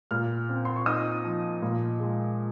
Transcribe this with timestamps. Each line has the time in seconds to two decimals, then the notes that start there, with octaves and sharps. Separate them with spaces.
0.11 A#2 F6
0.49 C4
0.65 C6
0.76 C#6
0.86 D#4 D#6
1.24 F3
1.62 A#2
2.00 G#3